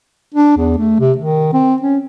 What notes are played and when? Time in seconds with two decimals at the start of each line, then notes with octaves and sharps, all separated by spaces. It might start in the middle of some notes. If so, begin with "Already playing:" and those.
0.34 D4
0.57 E2
0.78 A3
1.00 C3
1.18 D#3
1.53 C4
1.82 C#4